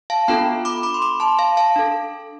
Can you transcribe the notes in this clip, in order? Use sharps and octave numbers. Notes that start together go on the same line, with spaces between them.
F5 A5
B3 D4 F4 A4 G5 B5
B5 D6
B5 D6
C6
B5 D6
A5 C6
F5 A5
F5 A5
D4 A4